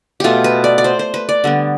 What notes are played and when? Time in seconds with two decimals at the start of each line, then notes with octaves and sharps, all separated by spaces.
0.20 B2 A3 F4 G4
0.44 B4
0.64 D5
0.78 D5
0.84 C5
0.99 C5
1.14 B4
1.29 D5
1.44 D3 G3 B3